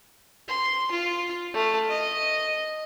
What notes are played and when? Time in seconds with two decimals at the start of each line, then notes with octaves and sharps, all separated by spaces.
0.48 C6
0.91 F4
1.54 A3 F6
1.88 D#5